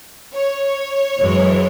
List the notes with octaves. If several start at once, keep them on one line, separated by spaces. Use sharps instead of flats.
C#5
F#2 E3 G#3